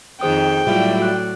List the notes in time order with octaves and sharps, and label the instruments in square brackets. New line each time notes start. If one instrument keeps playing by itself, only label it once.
[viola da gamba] F2 D#3 [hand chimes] G#4 C5 D#6 [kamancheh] G5
[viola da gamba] A2 F#3 D5 [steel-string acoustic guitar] G3 E4 F4
[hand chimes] F#4 F#6